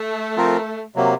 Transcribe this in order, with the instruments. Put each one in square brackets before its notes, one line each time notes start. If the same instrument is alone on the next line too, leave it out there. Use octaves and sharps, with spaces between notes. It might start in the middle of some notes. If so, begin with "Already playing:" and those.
Already playing: [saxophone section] A3
[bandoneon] F3 C4 F4 A#4
C3 F#3 A#3